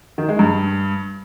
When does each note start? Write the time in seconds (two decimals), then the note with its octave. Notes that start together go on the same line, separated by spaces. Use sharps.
0.18 D#3
0.29 G#3
0.39 G2